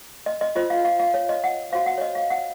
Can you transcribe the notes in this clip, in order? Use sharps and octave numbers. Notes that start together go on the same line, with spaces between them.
D#5
D#5
F4 C5 D#5
F5
F5
F5
C#5
D#5
F#5
F#4 C5 F5
F#5
C#5
D#5
F5
F#5